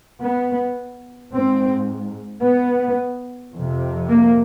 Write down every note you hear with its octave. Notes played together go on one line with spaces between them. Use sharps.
B3
G#2 C4
B3
F2 C3
A#3